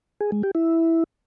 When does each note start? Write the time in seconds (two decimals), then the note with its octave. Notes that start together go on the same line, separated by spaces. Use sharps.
0.21 G#4
0.32 G#3
0.43 G4
0.55 E4